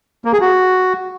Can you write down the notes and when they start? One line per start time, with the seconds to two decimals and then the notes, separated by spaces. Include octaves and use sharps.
0.25 A#3
0.33 G#4
0.41 F#4